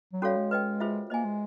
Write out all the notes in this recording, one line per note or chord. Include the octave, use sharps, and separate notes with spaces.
F#3
G3 C#4 F#4 A4 C#5 F5
G#3
B4 D#5 G5
F4 G#4 C5 E5
A#3 C5 D#5 G#5
G#3